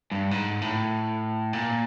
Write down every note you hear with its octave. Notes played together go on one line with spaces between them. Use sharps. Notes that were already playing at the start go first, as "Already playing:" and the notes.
G2
G#2
A2
A#2